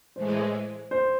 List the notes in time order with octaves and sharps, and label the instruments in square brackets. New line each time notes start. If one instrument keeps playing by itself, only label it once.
[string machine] A2 E3 G#3 [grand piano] C5
[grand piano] C5